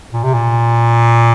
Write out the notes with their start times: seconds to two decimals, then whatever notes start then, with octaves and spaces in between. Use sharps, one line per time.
0.14 A#2
0.23 C3
0.34 A#2